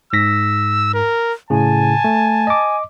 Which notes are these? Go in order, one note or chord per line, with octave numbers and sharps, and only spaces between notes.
G#2 E6 A#6 B6
A#4
A2 C#3 G#5 A5
A3
D#5 D6